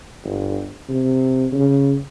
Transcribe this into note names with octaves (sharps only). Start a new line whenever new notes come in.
G1
C3
C#3